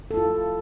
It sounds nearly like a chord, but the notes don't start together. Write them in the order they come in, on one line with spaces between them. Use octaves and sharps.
A4 E4 F4